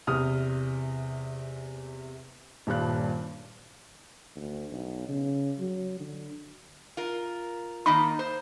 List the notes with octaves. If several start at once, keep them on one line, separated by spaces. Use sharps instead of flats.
E2 C3 D#6 F6
D#1 G2 A#2 D4 F#6
D2
B1
C#3
F#3
D3
F4 A#4
D#3 A#3 D#4 B5
C5